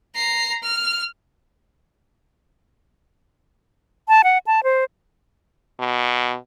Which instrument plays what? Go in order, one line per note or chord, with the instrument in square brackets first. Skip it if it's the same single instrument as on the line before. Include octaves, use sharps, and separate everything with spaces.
[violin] A#5 C7
F6
[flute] A5
F#5
A5
C5
[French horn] B2